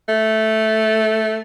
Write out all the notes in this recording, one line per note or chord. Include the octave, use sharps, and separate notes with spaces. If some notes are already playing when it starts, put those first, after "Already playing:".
A3